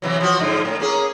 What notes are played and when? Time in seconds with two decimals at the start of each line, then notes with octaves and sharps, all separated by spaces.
0.02 C3 E3 F#3
0.21 F3 F#4
0.40 G#2 D3 F3
0.65 A2
0.80 A#3 C#4 G#4